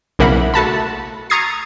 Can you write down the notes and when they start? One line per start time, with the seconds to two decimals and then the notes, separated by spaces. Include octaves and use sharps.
0.19 B1 C#3 A#3 E4 F#5 B5
0.54 A3 F#4 A5 B5
1.30 A#5 C#6 D#6 G#6 A6 C7